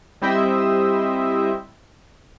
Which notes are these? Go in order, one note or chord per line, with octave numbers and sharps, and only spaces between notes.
G3 C4 E4 C5 D#5 E5